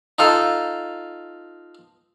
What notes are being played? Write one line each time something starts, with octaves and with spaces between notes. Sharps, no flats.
D#4 F4 A4